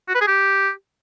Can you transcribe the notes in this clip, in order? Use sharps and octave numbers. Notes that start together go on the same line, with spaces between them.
F#4
B4
G#4
G4